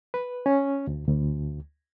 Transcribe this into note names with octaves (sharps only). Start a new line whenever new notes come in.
B4
C#4
D2
D2